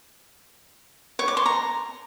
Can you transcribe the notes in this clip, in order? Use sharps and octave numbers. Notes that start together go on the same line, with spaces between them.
C#5
D6
C6
A#5